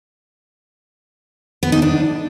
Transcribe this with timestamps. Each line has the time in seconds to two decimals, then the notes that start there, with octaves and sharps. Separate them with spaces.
1.63 B3
1.72 D#4
1.82 D4